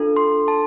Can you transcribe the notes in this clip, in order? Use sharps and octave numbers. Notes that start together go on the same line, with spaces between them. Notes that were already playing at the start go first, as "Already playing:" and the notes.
Already playing: D4 F4 A4
C6
A5